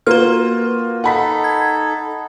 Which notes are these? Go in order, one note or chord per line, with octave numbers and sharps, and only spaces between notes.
A#3 F4 F#4 B4 F6
D#4 A4 F#5 B5 B6
G#6